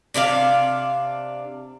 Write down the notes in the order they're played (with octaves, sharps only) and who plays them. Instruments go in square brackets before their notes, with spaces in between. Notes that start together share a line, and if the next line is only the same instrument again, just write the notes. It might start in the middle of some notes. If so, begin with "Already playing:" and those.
[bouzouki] C3 D4 A#4 F5